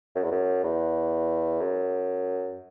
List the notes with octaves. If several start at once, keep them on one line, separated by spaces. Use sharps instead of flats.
F#2
E2
F#2
E2
F#2